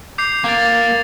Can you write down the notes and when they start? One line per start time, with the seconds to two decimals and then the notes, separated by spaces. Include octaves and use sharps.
0.18 D6 G6 C7
0.44 A#3 D6 A6
0.59 D6 A6